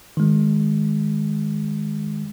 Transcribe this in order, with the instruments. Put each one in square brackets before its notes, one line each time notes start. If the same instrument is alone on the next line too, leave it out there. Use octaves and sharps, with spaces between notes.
[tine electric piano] D#3 G#3